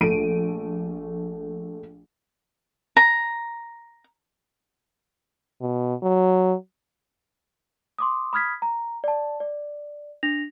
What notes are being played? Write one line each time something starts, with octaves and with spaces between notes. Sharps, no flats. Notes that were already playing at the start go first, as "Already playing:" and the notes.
A#1 A3 D7 D#7
A#5
B2
F#3
C6 D6 D#6
B5 D#6 F6 G#6 B6
A#5
D5 A5
D5
D4 A#6 F7